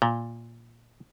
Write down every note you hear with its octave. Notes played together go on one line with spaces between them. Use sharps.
A#2